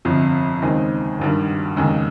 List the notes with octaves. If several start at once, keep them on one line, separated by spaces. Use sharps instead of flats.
G1 F2 C3
D#2 C#3 G#3 C4 D#4
G#1 G2 D#3 G3
F1 D#2 C#3 G#3